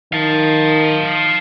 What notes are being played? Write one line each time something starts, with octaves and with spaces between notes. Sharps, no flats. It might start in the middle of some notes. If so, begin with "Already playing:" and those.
D#3 F5 A5